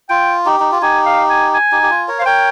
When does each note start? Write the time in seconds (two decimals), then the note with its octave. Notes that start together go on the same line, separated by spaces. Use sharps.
0.09 F4 G5
0.46 D#4 G4
0.60 D#4
0.72 F4
0.82 D#4 G4 G#5
1.06 F5
1.30 G#5
1.54 G#5
1.72 D#4 G4
1.83 G4
1.90 F4
2.08 A#4 C#5
2.19 C5 F5
2.26 A#4 C#5 G5